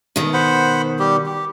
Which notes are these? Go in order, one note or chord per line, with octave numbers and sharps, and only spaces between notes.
B2 D#3
C5 F#5 B5
G3 G4
G4